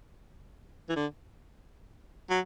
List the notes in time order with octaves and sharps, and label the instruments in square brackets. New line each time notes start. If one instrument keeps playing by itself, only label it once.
[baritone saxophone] E3
D3
F#3